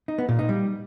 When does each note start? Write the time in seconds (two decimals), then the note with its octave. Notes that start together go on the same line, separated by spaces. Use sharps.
0.08 D#4
0.18 B3
0.29 A#2
0.39 D#4
0.49 G3